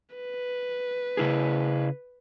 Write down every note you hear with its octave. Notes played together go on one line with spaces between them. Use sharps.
B4
C#3 E4 G#4